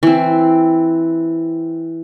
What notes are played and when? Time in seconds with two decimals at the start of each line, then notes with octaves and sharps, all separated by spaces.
0.03 E3 C4